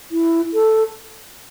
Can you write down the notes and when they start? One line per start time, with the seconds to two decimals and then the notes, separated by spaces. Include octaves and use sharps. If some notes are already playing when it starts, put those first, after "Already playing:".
0.11 E4
0.54 A4